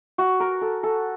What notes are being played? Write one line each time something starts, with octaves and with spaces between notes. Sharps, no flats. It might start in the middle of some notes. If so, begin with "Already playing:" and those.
F#4
A#4
A4
A4